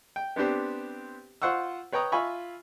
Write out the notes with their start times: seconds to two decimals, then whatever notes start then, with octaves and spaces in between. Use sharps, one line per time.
0.16 G5
0.36 B3 C4 D4 G4 C5
1.42 F4 C5 F#5 C#6 E6
1.92 B4 C#5 G5 A#5 D#6
2.12 F4 E5 G#5 B5 C#6